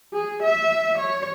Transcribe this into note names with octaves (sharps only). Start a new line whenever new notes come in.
G#4
E5
C#5